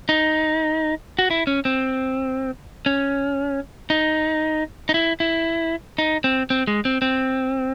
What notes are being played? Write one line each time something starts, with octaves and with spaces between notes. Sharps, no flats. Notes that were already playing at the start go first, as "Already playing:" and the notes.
D#4
F#4
E4
C#4
C4
C#4
D#4
D#4
E4
E4
D#4
C4
C4
G#3
C4
C4